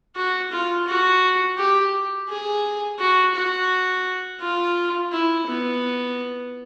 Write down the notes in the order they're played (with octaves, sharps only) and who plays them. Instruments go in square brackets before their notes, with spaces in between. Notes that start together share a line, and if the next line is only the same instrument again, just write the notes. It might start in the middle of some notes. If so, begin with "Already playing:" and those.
[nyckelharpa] F#4
F4
F#4
G4
G#4
F#4
F#4
F4
E4
B3